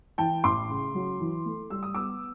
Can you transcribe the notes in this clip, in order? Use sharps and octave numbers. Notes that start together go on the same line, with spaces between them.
E3 G5 A5
A1 C6 D6
C#3
F#3
E3
A3
G3 E6
D#6
B3 D6 E6